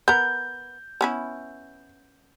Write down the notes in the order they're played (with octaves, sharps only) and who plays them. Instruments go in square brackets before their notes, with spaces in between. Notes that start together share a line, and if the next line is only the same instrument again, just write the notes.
[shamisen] B3 A#4 [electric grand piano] G6
[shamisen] B3 C#4 E4